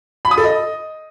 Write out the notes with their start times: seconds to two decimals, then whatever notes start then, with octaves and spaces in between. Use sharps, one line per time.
0.25 B5
0.31 D#6
0.38 A4
0.44 D#5